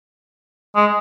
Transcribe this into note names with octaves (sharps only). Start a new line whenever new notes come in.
G#3